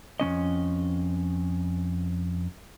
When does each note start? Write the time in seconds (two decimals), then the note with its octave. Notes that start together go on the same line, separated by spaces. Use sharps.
0.20 F2 F3 C#4 D#5